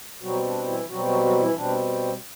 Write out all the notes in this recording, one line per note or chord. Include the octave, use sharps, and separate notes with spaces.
B2 F#3 G3 C4 F#4
D4
E3 E4
B2 F#3 G3 C4 F#4
F#3 F#4
F#3 F#4
E3 E4
B2 G3 C4 D4